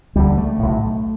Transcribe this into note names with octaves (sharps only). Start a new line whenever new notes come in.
D2 D3 G3
A3
B1 A2